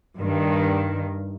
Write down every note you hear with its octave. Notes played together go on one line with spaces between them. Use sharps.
G2 D#3